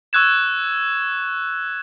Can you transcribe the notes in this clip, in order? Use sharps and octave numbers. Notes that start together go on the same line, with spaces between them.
C#6 E6 F#6 G#6 E7